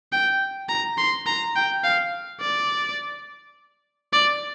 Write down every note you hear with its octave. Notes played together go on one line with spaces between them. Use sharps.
G5
A#5
C6
A#5
G5
F5
D5
D5